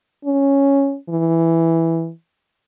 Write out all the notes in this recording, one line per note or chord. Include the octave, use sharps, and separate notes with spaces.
C#4
E3